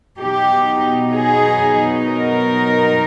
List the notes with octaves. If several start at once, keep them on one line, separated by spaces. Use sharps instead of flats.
B2 F#3 B3 D#4 G4
G#4
A#4